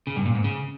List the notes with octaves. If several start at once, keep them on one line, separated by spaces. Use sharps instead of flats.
C#3
G2
A#2
G#2
C#3